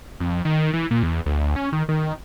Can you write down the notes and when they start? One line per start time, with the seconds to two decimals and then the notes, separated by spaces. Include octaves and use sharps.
0.20 F2
0.45 D#3
0.74 E3
0.91 A#2
1.03 E2
1.26 D2
1.56 C#4
1.73 D#3
1.89 D#3